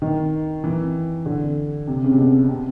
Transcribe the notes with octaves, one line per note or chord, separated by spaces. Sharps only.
D#3
E3
D3
C3
C#3
C3
B2
C3